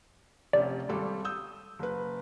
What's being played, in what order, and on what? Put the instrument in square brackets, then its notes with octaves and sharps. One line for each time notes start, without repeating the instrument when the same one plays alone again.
[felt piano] F1 C3 C#4 [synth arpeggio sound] D5
[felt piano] G#1 G3 A4
D#6 E6 G6
F#1 B4